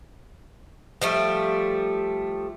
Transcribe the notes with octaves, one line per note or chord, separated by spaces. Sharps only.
F3 G3 A3